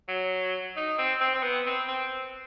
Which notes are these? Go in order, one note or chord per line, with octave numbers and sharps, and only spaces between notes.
F#3
D#4
C4
C4
C4
B3
C4
C4